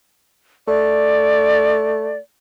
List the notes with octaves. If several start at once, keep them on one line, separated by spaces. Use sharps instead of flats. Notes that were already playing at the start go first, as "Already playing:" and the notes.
A3 D5